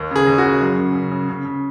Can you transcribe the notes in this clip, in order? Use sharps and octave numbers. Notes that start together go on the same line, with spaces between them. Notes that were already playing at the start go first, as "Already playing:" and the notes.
Already playing: D#2
C#3 G#4
D#2
F#4
C#3
F#2
C#3
C#3
C#3
C#3
C#3